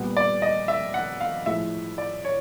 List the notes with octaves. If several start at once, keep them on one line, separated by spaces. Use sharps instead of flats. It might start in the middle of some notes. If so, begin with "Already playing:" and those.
Already playing: A#2 G3 B3
D5
D#5
E5
F#5
F5
A2 F3 G#3 E5
D5
C#5